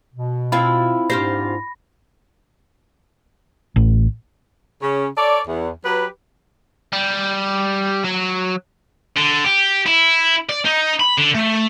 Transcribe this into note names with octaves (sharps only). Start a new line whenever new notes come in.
B2
C4 E4 F4 B5
G#2 D4 F4 G4 C5 A#6
A1
C#3 C#4
A4 C#5 D5
E2
F#3 G4 B4
G3
F#3
D3
G4
E4
D5
D#4
B5
D3
A3